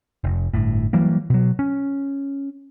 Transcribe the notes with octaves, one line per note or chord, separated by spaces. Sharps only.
F1
G1 A2
E3 F#3 G3 A#3
B2 F#3
C#4